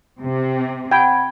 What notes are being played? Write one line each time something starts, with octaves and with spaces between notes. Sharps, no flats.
C3
F#5 G5 B5 G#6